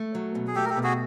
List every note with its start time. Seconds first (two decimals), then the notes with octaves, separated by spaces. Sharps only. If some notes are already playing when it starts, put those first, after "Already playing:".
Already playing: A3
0.15 F#3
0.35 B2
0.47 G#4
0.56 A3 G4 A4
0.65 A#4
0.69 G4 A4
0.77 B2
0.83 F#4 G#4